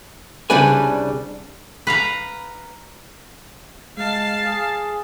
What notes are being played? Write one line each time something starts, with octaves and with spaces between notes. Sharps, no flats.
C2 C#3 G3 D4 B4 G#5
B4 F5 A#5
G#3 F5 A5
G#4